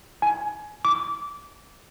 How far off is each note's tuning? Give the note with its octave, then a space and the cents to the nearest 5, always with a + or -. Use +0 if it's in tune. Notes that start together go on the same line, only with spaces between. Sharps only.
G#5 +20
D6 -20